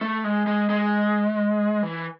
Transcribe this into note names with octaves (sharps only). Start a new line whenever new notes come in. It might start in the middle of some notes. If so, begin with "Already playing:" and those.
A3
G#3
G#3
G#3
E3